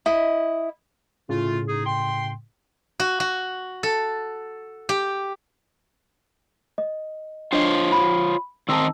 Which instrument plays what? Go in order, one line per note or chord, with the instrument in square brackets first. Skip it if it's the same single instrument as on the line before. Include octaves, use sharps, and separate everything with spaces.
[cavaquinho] E4 D#5
[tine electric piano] A2 C#3 [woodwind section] A3 F4
[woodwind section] D#4 G#4
G5 C6
[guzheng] F#4
F#4
A4
G4
[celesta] D#5
[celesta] D4 D#5 [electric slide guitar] F4 C5 C#5
[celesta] B5
[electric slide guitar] D#3 C4 D#4 [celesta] A5 E6